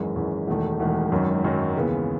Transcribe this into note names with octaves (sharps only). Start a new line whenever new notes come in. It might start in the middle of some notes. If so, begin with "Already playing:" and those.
Already playing: G#1 F#2 E3 G#3
G#1 F#2 E3 G#3
E1 E2 D#3 A3
E1 E2 D#3 A3
G#1 F#2 D#3 F#3
G#1 F#2 D#3 F#3
D#2 C#3 E3 B3